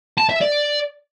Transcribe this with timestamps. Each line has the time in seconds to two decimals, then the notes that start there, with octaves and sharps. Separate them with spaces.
0.18 A5
0.29 E5
0.41 D5